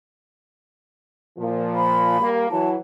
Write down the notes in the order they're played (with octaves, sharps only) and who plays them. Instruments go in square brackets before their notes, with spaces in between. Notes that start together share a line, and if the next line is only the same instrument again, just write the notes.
[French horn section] A#2 F3
[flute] B5
[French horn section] G3 A#3
[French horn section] E3 F#3 [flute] A5